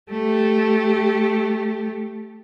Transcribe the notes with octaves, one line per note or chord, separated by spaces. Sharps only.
A3 G4